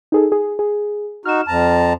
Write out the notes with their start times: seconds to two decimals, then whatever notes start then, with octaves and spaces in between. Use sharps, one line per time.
0.12 D#4 G#4 A4
0.32 G#4
0.59 G#4
1.25 D#4 F#4 F6 E7
1.48 F2 A5 A#5